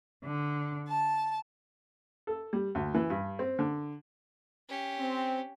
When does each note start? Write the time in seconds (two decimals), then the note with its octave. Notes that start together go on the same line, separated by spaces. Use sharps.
0.24 D3
0.89 A5
2.27 A4
2.53 G3
2.75 D2
2.94 E3
3.10 G2
3.39 C4
3.59 D3
4.69 C#4 G4
4.99 C4